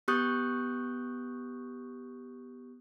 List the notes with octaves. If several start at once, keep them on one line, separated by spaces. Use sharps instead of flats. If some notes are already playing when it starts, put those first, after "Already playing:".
B3 G4 C#6 D#6 F#6 G6